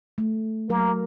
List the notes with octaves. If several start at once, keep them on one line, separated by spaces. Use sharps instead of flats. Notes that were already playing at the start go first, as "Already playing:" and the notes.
A3
F#3 A#3 A#4